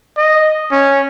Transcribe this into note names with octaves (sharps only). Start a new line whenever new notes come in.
D#5
C#4